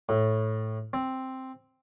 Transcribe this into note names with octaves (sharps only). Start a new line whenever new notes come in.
A2
C4